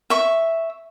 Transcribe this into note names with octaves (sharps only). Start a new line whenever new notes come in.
E5 C#6